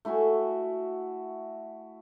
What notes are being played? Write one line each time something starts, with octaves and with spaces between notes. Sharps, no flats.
A3 E4 F#4 G#5